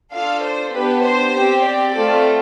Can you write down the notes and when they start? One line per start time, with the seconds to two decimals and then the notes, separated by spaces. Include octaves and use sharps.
0.13 D4 F4 A4 F5
0.43 C5
0.73 B3 D4 G4 B4
1.04 C5
1.35 C4 G4
1.65 D5
1.95 A3 C4 F4 A4